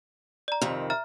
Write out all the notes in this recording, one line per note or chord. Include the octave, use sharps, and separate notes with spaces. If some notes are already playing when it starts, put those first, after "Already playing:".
D5 A#5
F2 C3 D#3
E5 A#5 F6